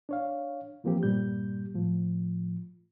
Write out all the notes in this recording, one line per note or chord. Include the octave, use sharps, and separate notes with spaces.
D4 C#5 F5
E3 F3 A#3 C4 G4
G2 A#2 G3 G6
A2 F3